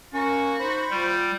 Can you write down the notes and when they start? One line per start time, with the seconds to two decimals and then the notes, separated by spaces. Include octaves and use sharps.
0.14 A#3 C#4 F#4 C#6
0.60 D#4 C5 B5 C#6
0.91 G3 F4 G5